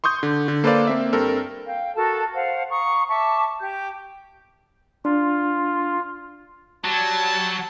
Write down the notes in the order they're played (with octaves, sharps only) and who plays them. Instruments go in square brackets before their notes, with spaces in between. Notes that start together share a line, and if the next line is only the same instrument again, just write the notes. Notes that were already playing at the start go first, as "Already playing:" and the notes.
[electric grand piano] C6 C#6 D#6 G6
D3
D3
A#3 A4 B4 C5 D5 F5
A#3 C4 E5
G2 C4 A4 A#4
[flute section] F5 G5
F#4 A4 A#4 A5
C5 F5 F#5
F5 A#5 C#6 D#6
E5 A5 C#6 D6
G4 G6
[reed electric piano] D4 [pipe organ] F4
[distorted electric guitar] F#3 [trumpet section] G3 A5